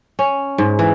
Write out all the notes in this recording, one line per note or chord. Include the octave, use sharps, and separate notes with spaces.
C#4
G#2
E3